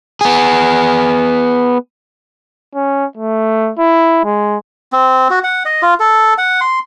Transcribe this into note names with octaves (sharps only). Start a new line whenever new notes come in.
B3 G#4
C#4
A3
E4
G#3
C4
F#4
F#5
D#5
F4
A4
F#5
C6